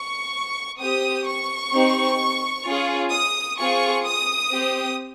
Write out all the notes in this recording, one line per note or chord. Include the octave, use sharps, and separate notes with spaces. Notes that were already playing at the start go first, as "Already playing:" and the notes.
Already playing: C#6
C4 G4 D#6
C#6
C4 D#4 G4
C#4 F4 G#4
D#6
C4 F4 G#4 C#6
D#6
C4 G4